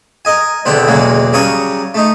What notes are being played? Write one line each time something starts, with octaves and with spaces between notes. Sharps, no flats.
A#4 D#5 G#5
B1 E2 D3 B3 C4 G5
B1 E2 C#3 F#3 G#3 A#3
C#3 F#3 G3 A#4 C#6 D#6
A3 D#4